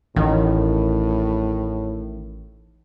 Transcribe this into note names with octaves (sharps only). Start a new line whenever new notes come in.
A1 A2 D#3